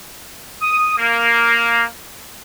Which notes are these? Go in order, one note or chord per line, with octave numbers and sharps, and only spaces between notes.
D#6
A#3